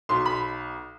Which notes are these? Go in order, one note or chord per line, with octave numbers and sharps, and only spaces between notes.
B1 B2 C6
B5